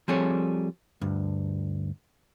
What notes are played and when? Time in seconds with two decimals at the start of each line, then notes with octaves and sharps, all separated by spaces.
0.08 F3 G3 C4 G#4 A4 C#5
1.01 D2 G2